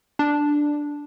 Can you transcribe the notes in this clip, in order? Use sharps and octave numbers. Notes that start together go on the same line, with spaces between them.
D4